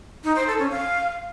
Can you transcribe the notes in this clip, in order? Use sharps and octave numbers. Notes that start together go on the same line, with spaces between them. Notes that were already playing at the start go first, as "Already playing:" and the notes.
D#4
C5
A4
C#4
F5